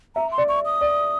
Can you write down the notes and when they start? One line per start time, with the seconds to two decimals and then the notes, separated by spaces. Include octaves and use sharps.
0.16 E5 A#5
0.32 C6
0.38 D5
0.48 C#6
0.65 D#6
0.81 D5